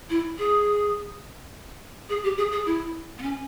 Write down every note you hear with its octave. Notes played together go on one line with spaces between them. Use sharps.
E4
G#4
G#4
G4
G#4
G#4
E4
B3
C#4